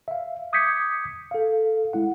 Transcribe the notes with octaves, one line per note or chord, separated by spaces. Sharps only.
E5 F5
D6 D#6 G6 G#6 B6 C#7
A4 F5
G#3 E4 F#5